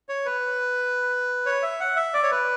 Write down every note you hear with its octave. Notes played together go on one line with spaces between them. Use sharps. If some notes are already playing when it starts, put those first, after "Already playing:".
C#5
B4
C#5
E5
F#5
E5
D5
C#5
B4